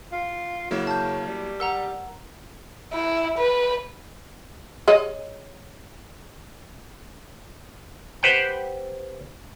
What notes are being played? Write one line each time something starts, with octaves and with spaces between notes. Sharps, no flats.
F4
C#3 F#3 A#3 E4
A5 G6
G3
A#4 F#5 A#5 E6
E4
B4
G#4 C#5 D#5
G4 B4 C5 F#5 G5